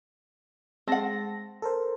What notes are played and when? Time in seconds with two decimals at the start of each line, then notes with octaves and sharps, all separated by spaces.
0.87 G#3 C4 F#5 A5 A#6
1.62 A4 A#4 C5